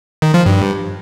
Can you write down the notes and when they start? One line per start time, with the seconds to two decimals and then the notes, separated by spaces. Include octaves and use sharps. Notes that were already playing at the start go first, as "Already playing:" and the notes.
0.22 D#3
0.34 F3
0.46 G2